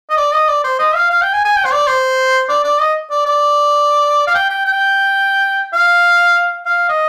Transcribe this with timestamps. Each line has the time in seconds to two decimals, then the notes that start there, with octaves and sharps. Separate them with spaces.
0.10 D#5
0.17 D5
0.33 D#5
0.48 D5
0.64 C5
0.79 D#5
0.94 F5
1.10 F5
1.22 G5
1.33 G#5
1.45 G#5
1.57 G5
1.65 C5
1.72 D5
1.87 C5
2.49 D5
2.64 D5
2.80 D#5
3.10 D5
3.26 D5
4.27 F5
4.35 G5
4.50 G5
4.65 G5
5.73 F5
6.66 F5
6.89 D#5